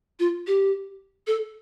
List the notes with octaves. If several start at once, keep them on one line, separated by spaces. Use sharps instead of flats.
F4
G4
A4